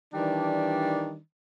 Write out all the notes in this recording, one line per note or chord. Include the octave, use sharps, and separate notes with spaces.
D#3 E3 G3 D4